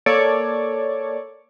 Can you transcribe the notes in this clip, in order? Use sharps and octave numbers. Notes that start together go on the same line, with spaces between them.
A#3 A4 C#5 D5